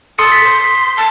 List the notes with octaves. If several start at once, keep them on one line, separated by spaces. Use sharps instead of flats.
A4 C6 D#6 C#7
B6
C6
B6
A5